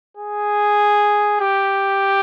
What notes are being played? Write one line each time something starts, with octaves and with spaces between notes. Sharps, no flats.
G#4
G4